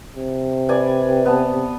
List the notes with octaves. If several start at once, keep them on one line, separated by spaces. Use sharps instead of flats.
C3
B4 D5 G#5
B3 A5